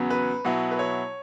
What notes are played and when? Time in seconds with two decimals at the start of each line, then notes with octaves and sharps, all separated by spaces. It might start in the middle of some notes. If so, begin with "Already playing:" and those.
Already playing: E2 C#3 F#3 B3
0.10 B4
0.45 B2 F#3 B3 E4
0.71 B4
0.79 C#5